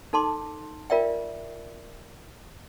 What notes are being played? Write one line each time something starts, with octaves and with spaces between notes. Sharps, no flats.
D#4 A4 A5 C6 D6
F4 A#4 D5 E5 G5